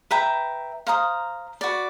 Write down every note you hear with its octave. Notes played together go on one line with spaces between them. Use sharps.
B4 E5 G5 A#5
C5 F5 A#5 D#6
F#4 B4 D5